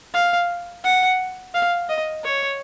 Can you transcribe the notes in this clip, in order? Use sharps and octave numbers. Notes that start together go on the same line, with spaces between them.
F5
F#5
F5
D#5
C#5